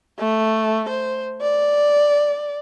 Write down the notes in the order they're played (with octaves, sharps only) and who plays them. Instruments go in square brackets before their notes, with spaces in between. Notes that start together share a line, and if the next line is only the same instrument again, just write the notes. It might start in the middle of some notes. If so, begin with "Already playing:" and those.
[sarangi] A3
C5
D5